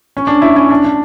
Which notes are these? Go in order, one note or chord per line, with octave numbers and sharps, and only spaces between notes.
C#4
D4
C#4 E4
C#4 E4
D4
D4